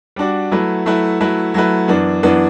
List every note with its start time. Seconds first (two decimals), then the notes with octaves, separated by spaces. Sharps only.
0.16 G3 D4 F#4
0.52 F#3 A3 E4 B4
0.86 F#3 A3 E4 B4
1.20 F#3 A3 E4 B4
1.54 F#3 A3 E4 B4
1.88 F#2 E3 B3 D4
2.23 F#2 E3 B3 D4